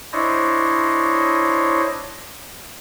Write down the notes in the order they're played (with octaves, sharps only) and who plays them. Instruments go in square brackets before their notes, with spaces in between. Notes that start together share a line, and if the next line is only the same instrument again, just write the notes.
[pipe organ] D4 E4 C5 C#5 D#5